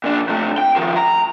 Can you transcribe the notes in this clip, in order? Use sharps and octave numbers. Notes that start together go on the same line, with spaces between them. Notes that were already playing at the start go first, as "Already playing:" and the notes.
A#2 D4
C3 A3
G5
D#3 F3
A#5